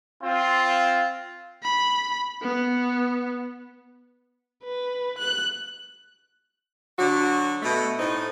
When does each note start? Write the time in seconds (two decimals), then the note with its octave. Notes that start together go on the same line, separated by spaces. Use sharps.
0.21 C4 F4
1.63 B5
2.42 B3
4.64 B4
5.18 F#6
6.99 D3 F#3 F#4
7.62 B2 A3
7.99 A2 C4 D#4